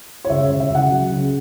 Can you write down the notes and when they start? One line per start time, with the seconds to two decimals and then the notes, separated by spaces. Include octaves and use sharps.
0.25 C#5
0.30 C#2 E5
0.44 C#5
0.50 C#2
0.60 E5
0.70 C#2
0.75 F#5
0.90 F#3
1.10 C#3